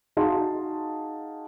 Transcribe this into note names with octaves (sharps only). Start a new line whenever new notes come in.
D#4 F#4 G#4 F5 A5 C6